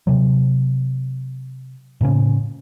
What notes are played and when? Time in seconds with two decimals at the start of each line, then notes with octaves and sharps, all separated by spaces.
0.07 C3 F#3
2.01 A2 C#3 A#3 C#4